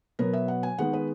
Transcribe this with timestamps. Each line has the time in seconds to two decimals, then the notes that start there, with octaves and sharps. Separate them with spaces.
0.19 B2 F#3 B3 A#4
0.33 E5
0.48 F#5
0.63 G#5
0.78 D#3 G#3 B3 F#5
0.93 B4